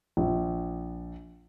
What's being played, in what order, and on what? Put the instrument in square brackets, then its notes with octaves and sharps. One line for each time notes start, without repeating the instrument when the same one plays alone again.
[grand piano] A#1